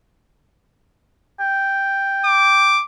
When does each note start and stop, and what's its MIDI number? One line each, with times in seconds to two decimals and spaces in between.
1.40 2.78 79
2.25 2.84 86